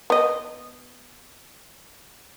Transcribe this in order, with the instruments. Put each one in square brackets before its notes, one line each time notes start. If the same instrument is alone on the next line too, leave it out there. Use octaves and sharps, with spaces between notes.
[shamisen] B3 D#5